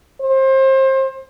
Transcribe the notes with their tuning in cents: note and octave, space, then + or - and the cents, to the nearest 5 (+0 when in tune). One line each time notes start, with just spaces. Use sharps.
C5 +30